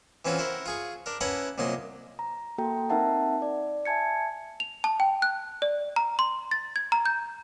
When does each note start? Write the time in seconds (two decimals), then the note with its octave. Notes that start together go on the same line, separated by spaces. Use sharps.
0.25 E3 C4 C#4 F4 F#4
0.39 E4 F#4 A#4 C5
0.66 F4 G#4 C#6
1.06 D4 A#4
1.21 C#4 E4 B4 F#5 A5 A#5
1.58 C2 A#2 F#3 D#4 C6
2.19 A#5
2.58 A#3 F#4 A4 G5 A#5
2.90 C4 D#4 A#4 E5 F#5 A5
3.42 D5
3.85 E5 G#5 A5 G#6 C#7
4.60 F7
4.84 A5
5.00 G5
5.22 F#6
5.62 D5
5.96 A#5
6.19 C6
6.51 A6
6.76 G#6
6.92 A#5
7.06 G6